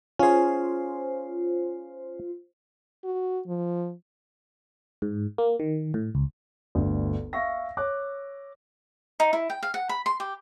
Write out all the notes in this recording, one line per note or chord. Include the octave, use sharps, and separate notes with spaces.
C#4 F4 G#4 C5
F#4
F3
G#2
A#3
D#3
A2
C#2
G1 D2
E5 F5 C#6 E6 A#6
C#5 D6 F#6
D#4
E4
G5
F5
F#5
B5
C6
G4